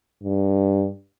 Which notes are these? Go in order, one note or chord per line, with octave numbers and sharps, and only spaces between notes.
G2